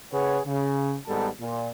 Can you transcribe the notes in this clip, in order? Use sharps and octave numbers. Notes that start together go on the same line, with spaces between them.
C#3 G#4 B4 C#5 F#5
C#3
G#1 G#2 G3 B3 A4 A5
A#2